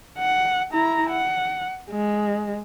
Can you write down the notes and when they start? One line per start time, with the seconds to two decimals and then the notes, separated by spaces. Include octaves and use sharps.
0.18 F#5
0.72 E4 A#5
1.10 F#5
1.90 G#3